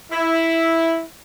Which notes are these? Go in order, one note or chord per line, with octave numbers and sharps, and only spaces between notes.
E4